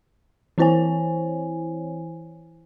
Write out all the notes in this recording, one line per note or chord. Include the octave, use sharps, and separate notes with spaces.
E3 C4 E4 C5 C#5 G#5